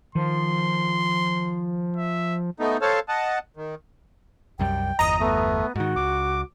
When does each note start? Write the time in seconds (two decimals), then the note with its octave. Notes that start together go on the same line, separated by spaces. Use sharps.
0.15 D#3 F3 C6
1.97 E5
2.59 A3 B3 D#4
2.81 A4 C5 C#5 F5 A5
3.09 D#5 F#5 A5
3.57 D#3
4.59 C2 F#2 G3 G5
4.99 G1 E2 D#5 A#5 D#6
5.20 A3 B3
5.76 G#2 D#3 F#4
5.96 C#2 D6